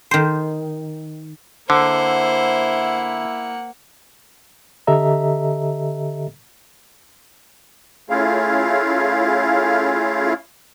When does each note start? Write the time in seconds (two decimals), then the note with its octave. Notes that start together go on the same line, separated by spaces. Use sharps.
0.11 D#3 C5
1.70 D3 A#3 E4 C5 E5 F#5
4.87 D3 G4 A4 D#5 E5 A#5
8.10 A3 C#4 E4 F4 G#4 F5